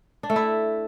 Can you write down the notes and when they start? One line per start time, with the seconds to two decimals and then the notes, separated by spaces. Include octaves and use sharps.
0.23 D4
0.30 A3
0.36 E4